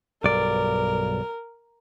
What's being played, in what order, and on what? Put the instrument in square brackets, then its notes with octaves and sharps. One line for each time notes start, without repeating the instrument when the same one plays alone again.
[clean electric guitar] B1 G2 D5 [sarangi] A#4